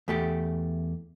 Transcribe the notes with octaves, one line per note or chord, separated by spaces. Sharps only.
E2 A3 G4